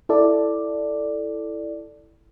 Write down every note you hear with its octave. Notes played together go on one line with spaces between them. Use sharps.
E4 A4 D5